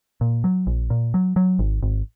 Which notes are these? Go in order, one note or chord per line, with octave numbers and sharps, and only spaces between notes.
A#2
F#3
A#1
A#2
F#3
F#3
G#1
G#1